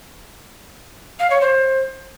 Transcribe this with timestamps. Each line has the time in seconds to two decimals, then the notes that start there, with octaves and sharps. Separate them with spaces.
1.19 F5
1.30 C#5
1.40 C5